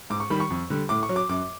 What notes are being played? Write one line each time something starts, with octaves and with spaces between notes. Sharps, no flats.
G#2 D6
C#6
D#3 G3 B5
C#6
F2
D3 G3
A2 D6
C#6
F#3
D6
F#2 D6